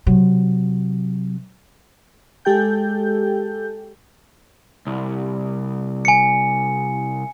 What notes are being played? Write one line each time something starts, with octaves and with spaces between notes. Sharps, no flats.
C3 F#3
G#3 G4 A4 G5 G6
C2
G#5 C#7